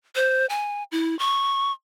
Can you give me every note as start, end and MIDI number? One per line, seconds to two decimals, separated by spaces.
0.16 0.46 72
0.49 0.83 80
0.92 1.17 64
1.19 1.72 85